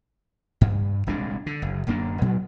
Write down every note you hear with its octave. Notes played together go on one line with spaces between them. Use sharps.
G2
D#1 C2 G#3 D4
D3
F#1
D1 F#2 A#3 D4
A#2 F#3